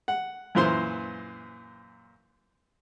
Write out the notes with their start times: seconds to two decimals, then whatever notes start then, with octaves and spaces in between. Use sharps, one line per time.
0.08 F#5
0.55 F#2 A#2 E3 C5 C6